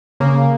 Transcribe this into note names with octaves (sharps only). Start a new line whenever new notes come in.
C#3 A#3